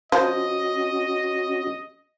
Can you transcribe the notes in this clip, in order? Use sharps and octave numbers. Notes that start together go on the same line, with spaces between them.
F3 C#4 F#4 D#5